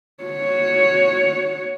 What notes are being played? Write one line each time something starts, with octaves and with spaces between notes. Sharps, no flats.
F#4 C#5